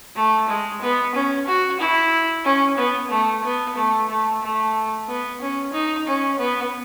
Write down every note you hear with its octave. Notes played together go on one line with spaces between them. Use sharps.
A3
G#3
B3
C#4
F#4
E4
C#4
B3
A3
B3
A3
A3
A3
B3
C#4
D#4
C#4
B3